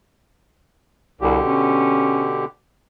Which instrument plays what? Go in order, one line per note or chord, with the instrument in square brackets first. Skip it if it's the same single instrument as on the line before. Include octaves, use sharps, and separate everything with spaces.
[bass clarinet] C2 [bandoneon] B2 D3 G4
[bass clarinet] C#4